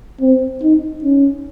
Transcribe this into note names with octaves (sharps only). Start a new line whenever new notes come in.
C4
D#4
C#4